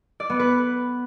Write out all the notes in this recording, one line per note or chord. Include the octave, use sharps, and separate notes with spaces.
D5
B3
B4